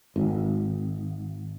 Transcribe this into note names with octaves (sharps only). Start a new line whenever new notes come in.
G#1